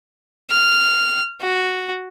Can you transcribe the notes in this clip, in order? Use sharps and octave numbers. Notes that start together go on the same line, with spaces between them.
F6
F#4